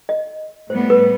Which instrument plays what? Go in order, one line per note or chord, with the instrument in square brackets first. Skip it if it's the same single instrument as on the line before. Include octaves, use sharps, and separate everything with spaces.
[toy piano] D#5
[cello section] A2 G3 B3 [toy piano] C5
[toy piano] B4